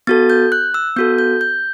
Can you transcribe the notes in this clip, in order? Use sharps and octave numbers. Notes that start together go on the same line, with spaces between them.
B3 F#4 A4 A6
G6
F#6
E6
B3 F#4 A4 G6
G6
G6